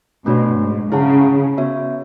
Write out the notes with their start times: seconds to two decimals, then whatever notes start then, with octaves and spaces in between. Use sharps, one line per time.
0.25 B2 A3 D4 F#4 C#5
0.59 G#2
0.92 C#3 E4 G#4 C#5 F#5 A5
1.58 B3 F#4 C#5 E5